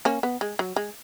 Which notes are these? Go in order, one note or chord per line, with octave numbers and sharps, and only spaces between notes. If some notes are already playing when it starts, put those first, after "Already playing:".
A#3 C#4
B3
G#3
F#3
G#3